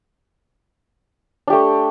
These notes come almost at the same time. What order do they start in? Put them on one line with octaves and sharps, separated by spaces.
D4 G4 A3